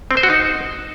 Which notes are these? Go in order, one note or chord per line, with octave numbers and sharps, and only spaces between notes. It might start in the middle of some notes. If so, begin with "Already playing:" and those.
C4
C5
F#4
D#4